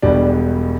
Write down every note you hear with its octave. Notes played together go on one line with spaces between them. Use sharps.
E1 E2 B2 G3 B3 D4